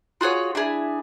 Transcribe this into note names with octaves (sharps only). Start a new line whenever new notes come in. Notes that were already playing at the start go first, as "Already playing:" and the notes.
F4 F#4 G#4 C#5
D4 E4 G#4